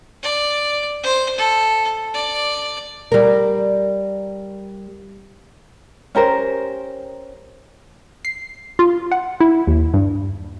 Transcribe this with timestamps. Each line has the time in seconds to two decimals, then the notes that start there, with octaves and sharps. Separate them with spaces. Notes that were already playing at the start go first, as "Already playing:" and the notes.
0.23 D5
1.03 C5
1.38 A4
2.14 D5
3.12 G3 A#4
6.15 C#4 G4 A#4 C5
8.25 C7
8.79 F4
9.12 F#5
9.40 E4
9.67 D#2
9.94 G2